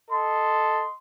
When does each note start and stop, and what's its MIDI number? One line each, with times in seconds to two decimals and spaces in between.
0.11 0.85 69
0.11 0.92 75
0.11 0.92 84